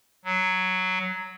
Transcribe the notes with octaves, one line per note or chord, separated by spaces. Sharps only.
F#3